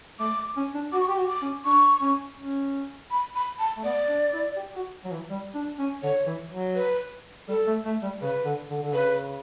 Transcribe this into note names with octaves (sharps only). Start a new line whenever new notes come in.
A3 D6
C#4
D4
F#4 D6
C#6
G4 D6
F#4
D6
C#4
D4 C#6
C#4
C#4
B5
B5
A5
A3
B3 D5
D4
E4
G4
F#4
F#3
E3
G3
D4
C#4
D3 C#5
E3
F#3
B4
G3 A4
A3
A3
G3
C#3 B4
D3
D3
D3
C#3 B4